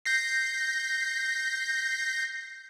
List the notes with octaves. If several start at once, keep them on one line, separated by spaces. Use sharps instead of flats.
G6 A#6 C7